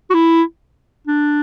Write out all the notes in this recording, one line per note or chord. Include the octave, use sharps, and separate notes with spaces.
F#4
E4
D4